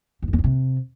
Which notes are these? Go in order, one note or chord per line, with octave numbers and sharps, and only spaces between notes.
E2
F#2
E2
D3
C3